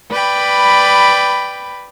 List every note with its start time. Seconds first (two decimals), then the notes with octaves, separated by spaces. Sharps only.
0.11 B4 D5 G5 B5